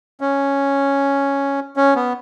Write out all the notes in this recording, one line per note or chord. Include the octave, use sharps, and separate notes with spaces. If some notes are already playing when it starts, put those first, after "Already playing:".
C#4
C#4
B3